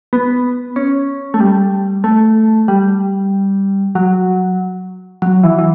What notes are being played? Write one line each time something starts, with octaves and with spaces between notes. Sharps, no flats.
B3
C#4
A3
G3
A3
G3
F#3
F#3
E3
E3